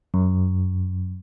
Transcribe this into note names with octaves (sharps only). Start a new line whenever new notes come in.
F#2